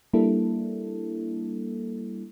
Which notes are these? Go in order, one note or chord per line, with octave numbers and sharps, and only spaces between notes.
G3 A#3 D4 E4 A4